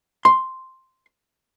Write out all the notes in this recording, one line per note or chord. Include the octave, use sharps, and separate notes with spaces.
C6